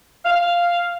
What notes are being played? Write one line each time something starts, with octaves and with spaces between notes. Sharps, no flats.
F5